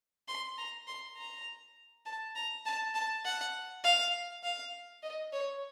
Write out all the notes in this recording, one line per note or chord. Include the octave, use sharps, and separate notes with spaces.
C6
A#5
C6
A#5
A5
A#5
A5
A5
F#5
F5
F5
D#5
C#5